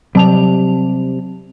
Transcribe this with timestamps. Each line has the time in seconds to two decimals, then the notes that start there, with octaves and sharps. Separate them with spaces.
0.15 C3 F#3 G3 A5 F7